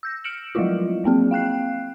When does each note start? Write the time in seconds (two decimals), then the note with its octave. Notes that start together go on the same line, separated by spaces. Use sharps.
0.03 E6 G6 A#6
0.24 F6 C#7 D7 E7 F#7
0.55 F3 F#3 G#3 A3 E4 F4
1.04 F#3 A#3 C4 G#4
1.31 F5 G5 F#6 C7